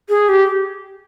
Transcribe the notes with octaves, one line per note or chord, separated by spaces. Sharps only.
G#4
G4